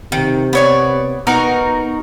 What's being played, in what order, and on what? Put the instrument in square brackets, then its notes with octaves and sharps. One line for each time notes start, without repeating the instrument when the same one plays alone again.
[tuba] C3 [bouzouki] D#3
[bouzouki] B3 C#5 D5
[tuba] B3 [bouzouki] D#4 F#4 A#4